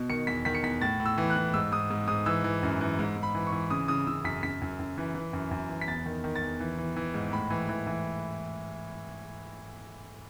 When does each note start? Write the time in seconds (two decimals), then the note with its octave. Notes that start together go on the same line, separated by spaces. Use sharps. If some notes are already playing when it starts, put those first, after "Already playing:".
Already playing: B2
0.10 D#3 C#7
0.27 E2 B6
0.45 D#3 B6
0.55 C#7
0.63 E2 B6
0.81 A2 A6
1.00 A2
1.06 E6
1.18 E3
1.30 F#6
1.36 E3
1.54 G#2 E6
1.72 G#2 D#6
1.90 G#2
2.08 G#2 D#6
2.26 E3 E6
2.44 E3
2.63 F#2
2.81 E3
2.99 G#2
3.16 G#2
3.23 B5
3.35 E3
3.47 C#6
3.52 E3
3.70 C#3 D#6
3.88 C#3 D#6
4.07 C#3 E6
4.25 F#2 B6
4.43 F#2 B6
4.62 F#2
4.79 F#2
4.98 E3
5.15 E3
5.33 F#2
5.51 F#2
5.69 E3
5.81 B6
5.87 E2 A6
6.06 D#3
6.24 D#3
6.36 A6
6.42 E2
6.60 E3
6.78 E3
6.96 E3
7.14 G#2
7.32 A2 B5
7.50 E3
7.69 E3
7.87 E3